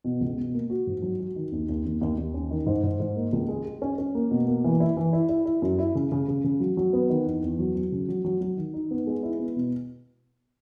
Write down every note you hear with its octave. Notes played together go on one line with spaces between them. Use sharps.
B2
C#2
B2
A#3
F#4
G#2
F#3
F#4
D#3
D#2
D#2
D#2
D#2
D#2
C#4
D#3
G#2
G#2
G#2
A#3
C#2
G#3
G#3
C#4
C#4
A#3
B2
A#3
E3
E4
E3
E4
E4
E4
F#2
E4
C#3
C#3
C#3
C#3
F#3
F#3
B3
D#3
E2
E2
F#3
F#3
C#3
F#3
F#3
F#3
D#3
D#4
B3
G#3
E4
B3
B2